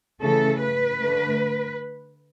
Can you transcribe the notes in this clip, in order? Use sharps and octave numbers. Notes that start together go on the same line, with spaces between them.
C#3 E3 A3 A4
B4
D3 A3